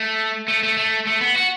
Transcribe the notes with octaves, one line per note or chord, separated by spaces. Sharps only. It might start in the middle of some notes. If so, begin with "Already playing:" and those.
Already playing: A3
A3
A3
A3
A3
B3
F#4